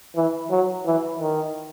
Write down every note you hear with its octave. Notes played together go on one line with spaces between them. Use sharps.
E3
F#3
E3
D#3